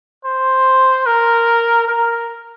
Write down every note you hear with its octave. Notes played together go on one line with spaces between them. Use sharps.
C5
A#4
A#4